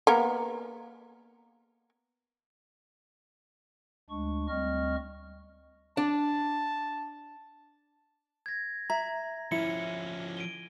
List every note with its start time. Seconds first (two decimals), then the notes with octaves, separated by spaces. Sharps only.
0.07 A#3 B3 A#4
4.10 D2 G#3 D4 C#6
4.49 D2 G3 C4 D#5 C#6 F6
5.97 D4 A5
8.46 G#6 A#6
8.90 E5 A#5
9.52 F3 C#4 E4 C#7
10.37 D7 D#7 G7